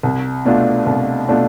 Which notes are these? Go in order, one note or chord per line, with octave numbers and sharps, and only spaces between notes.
C2
B2 A3 D4 F4
C2
B2 A3 D4 F4